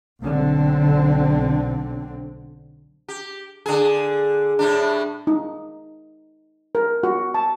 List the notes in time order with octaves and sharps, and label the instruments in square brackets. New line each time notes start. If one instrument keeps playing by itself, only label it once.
[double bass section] B1 D3 C4
[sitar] G4
D3 G#4
A2 G3 D4
[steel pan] D#4
A#4
F#4
A5